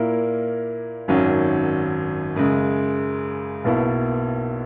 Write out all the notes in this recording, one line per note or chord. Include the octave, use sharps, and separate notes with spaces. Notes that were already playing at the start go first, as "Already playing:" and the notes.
Already playing: A#2 A#3 E4 A#4
G#1 F#2 D#3 F#3 C#4
F#2 C#3 G#3
B1 B2 A#3 E4